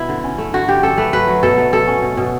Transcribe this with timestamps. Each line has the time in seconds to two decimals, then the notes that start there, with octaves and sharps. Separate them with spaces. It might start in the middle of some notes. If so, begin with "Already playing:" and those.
Already playing: B2 E4
0.09 D3
0.24 C#4
0.38 A3
0.54 D3 F#4
0.68 D3 G4
0.83 C#4 A4
0.97 A3 B4
1.13 F#3 B4
1.28 F#3
1.43 B2 A4
1.58 A3
1.72 B2 A4
1.87 C#4
2.02 B2
2.17 B2